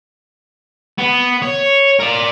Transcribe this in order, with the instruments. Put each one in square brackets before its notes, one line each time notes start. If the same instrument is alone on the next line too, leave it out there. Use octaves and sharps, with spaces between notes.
[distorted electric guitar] B3
C#5
A#4 D5